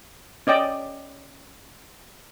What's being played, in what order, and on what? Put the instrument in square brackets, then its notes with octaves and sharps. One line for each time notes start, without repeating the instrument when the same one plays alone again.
[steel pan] C#4 D5 D#5 G5